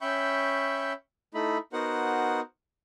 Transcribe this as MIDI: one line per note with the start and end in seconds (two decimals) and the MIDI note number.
0.01 0.93 61
0.01 0.93 76
0.01 0.93 79
0.01 0.93 83
0.01 0.93 85
0.01 0.93 91
1.34 1.58 57
1.34 1.58 63
1.34 1.58 64
1.34 1.58 83
1.73 2.40 59
1.73 2.40 63
1.73 2.40 66
1.73 2.40 70
1.73 2.40 72
1.73 2.40 78